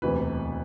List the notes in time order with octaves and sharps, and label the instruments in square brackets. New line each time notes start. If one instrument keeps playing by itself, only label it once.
[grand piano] E1 D2 C3 E3 B4